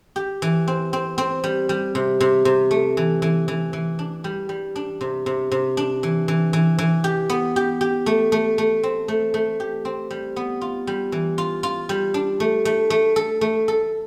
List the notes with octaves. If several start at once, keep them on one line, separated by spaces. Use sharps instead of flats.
G4
E3
C4
C4
C4
G3
G3
C3
C3
C3
A3
E3
E3
E3
E3
D4
G3
G3
D4
C3
C3
C3
D4
E3
E3
E3
E3
G4
B3
G4
G4
A3
A3
A3
C4
A3
A3
G4
C4
G3
B3
F4
G3
E3
F4
F4
G3
D4
A3
A3
A3
A4
A3
A4